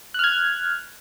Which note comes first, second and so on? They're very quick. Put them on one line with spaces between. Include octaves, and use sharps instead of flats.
F#6 F6 G#6